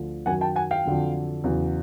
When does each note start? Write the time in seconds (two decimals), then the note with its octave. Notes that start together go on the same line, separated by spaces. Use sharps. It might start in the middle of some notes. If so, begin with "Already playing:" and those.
Already playing: D2 D3 F3
0.26 F#2 D#3 F#3 F#5 G#5
0.41 G5 A5
0.56 F#5 G#5
0.71 F5 G5
0.85 F2 D3 F#3
1.44 E2 C#3 F#3